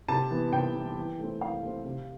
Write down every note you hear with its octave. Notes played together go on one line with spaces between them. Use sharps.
C3 A5
E3 B3
C3 G5
E3 B3
E3
A3 C4
E3 F5
A3 C4
C3